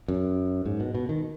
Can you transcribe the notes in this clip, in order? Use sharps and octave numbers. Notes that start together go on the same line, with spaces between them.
F#2
G#2
B2
B2
D#3